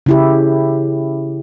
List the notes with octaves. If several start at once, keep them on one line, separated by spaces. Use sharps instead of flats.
C#3 E4 G4